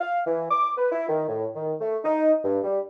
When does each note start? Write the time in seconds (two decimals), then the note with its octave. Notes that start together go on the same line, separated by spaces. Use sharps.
0.01 F5
0.26 E3
0.50 D6
0.78 B4
0.92 E4
1.09 D#3
1.28 A2
1.56 D#3
1.80 A3
2.04 D#4
2.44 G2
2.64 G3